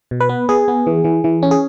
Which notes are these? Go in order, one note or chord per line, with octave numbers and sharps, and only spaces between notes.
B2
B4
B3
B3 G#4
B3
E3
E3
E3
C#4
G#4